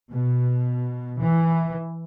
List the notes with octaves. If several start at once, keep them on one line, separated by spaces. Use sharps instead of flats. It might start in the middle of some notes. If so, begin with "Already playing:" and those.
B2
E3